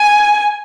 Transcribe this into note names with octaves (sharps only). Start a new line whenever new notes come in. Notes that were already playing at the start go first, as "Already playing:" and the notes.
Already playing: G#5